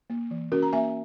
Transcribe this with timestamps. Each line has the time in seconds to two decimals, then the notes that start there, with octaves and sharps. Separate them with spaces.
0.10 A#3
0.31 E3
0.52 C#4 F#4 A#4
0.63 A#5
0.73 A#3 E5 G#5